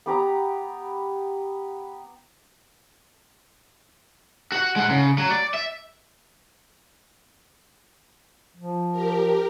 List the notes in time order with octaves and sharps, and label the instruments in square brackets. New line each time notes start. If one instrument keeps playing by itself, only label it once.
[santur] B3 G4 A#5
[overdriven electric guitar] F#4 F#5
G#3 F#5
C#3
F#3
D5
E5
[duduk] F3
[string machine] G4 A#4